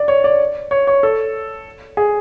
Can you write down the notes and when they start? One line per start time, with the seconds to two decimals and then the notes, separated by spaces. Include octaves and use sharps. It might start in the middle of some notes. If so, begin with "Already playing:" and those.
Already playing: D5
0.08 C#5
0.24 D5
0.71 C#5
0.87 C#5
1.03 A4
1.97 G#4